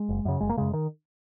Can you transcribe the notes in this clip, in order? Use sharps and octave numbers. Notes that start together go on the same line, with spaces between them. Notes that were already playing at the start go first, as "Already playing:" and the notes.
Already playing: G#3
F#1
F#2 C#3
F#1 G#3
A#3
F#2 C#3 G#3
D#3